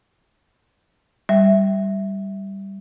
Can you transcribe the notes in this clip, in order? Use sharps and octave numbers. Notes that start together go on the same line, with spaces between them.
G3 E5